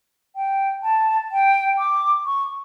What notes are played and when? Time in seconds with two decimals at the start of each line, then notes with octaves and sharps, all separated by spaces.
0.36 G5
0.83 A5
1.32 G5
1.78 D6
2.26 C#6